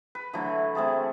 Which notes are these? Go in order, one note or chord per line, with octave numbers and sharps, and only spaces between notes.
B4
D3 E3 F#3 A3
A3 C4 G#4 A5